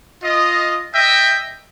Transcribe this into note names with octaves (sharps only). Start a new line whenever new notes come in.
F4 D#5
D#5 E5 G5